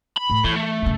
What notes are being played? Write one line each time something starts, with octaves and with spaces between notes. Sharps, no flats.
B5
A2
A2 E3
A3
F#2 C#3